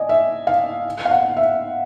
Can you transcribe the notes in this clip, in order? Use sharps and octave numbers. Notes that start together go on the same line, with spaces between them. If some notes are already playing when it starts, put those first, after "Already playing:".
Already playing: D5 D#5 G#5
E5
F5
F5
F#5
E5